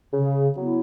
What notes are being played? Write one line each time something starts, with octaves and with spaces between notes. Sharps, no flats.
C#3
F#3 B3 E4